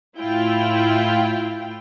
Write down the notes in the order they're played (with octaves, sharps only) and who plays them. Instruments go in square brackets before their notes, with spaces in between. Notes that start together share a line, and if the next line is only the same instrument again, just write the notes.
[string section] A2 E4 F4 G5